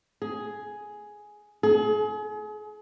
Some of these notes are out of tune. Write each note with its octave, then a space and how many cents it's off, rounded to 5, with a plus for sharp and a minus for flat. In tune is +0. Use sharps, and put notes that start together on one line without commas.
G#4 +5
G#4 +35